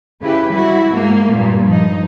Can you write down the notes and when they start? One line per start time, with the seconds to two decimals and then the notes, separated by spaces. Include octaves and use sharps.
0.23 C#3 E4 G4 B4
0.53 G3 E4 F#4
0.92 G#2 A#3
1.32 G2 A#2
1.67 F3 D#4